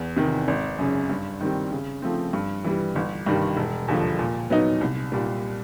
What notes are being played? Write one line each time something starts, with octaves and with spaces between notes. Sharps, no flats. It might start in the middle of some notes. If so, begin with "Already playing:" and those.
Already playing: E2
C3 D#3
G#1
F#2 C#3
G2
D#3 G3 C4
C#3
F3 A3 C4
G2
E3 G3
G1
G2 D#3 G3
E1
D#2 D3 F3
A#2
F#3 B3 D#4
C2
A#2 G3